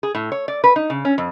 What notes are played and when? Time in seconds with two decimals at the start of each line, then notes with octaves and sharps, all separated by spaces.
0.03 G#4
0.15 A2
0.32 C#5
0.48 D5
0.64 B4
0.76 D#4
0.90 C#3
1.05 C#4
1.18 F2